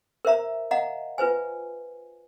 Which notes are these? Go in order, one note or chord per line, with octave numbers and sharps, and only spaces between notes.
A#4 C5 E5 A#5
D#5 F5 F#5 A#5
F4 B4 C5 G#5